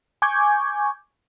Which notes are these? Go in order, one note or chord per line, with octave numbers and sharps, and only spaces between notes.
G#5 C#6 D6 G6 G#6